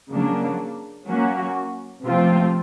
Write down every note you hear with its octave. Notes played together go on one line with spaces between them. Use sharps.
C#3 F#3 A#3 D4
F#3 A#3 C#4 F#4
C3 F3 A3 C4 F4